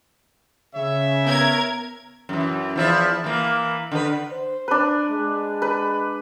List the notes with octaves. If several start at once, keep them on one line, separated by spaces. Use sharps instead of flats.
C#3 C#5 E5
B3 A#4 G#6
F#2 E3
E2 F3 E4
E3 A#3
D3 B4
C5
D4 B4
G#3
B4